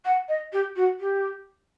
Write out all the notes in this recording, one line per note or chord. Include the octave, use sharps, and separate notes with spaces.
F#5
D#5
G4
F#4
G4